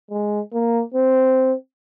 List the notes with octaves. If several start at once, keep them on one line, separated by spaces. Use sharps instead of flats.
G#3
A#3
C4